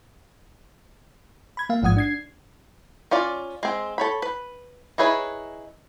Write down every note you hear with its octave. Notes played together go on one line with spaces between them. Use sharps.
B5 G#6
A#3 F5
A1 G#2 F3 F#5 D#6 G#6
D4 G#6 C7
C#4 F4 D5
G#3 C4
A4 C#5 B5
B4
D#4 E4 G#4 B4 C#5